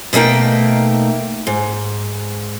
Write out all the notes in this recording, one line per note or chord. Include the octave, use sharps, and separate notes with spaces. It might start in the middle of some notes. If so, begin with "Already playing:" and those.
B2 A3 A#3 D#4 G5
G#2